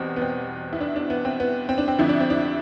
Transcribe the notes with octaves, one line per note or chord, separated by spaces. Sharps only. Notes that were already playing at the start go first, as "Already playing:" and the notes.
Already playing: E2 B2 G3 C4
B3
C4
E4
D4
D4
B3
C4
B3
C4
D4
C4
F2 D3 F3 E4
D4
C4
D4